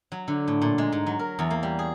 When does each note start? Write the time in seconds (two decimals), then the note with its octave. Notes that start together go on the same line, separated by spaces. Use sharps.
0.12 F#3
0.28 D3
0.48 A2
0.62 A#2
0.78 G#3
0.92 G#2
1.07 F#3
1.19 A#4
1.39 E2
1.51 A#3
1.63 G3
1.79 G#4